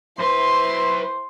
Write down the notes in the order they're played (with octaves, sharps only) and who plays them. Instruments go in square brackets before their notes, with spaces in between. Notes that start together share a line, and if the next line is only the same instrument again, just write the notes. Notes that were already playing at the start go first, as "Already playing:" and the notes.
[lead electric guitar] B1 B4 [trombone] E4 [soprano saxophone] C5 [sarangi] C6